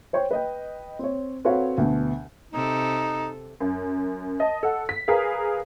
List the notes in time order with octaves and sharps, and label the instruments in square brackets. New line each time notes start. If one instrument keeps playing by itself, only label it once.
[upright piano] C5 C#5 G5 C#6
B4 D#5 G5
C4 C#5
C4 F#4 A4 B4 C#5 F5
D2 B2
[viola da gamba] C3 A4 [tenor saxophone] D#4
[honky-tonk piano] F#2
D#5 A5
A4 F#5
B6
G#4 A#4 B4 F5